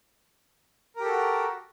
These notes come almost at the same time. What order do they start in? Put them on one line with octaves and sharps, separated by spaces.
A#4 G4 A4 F#4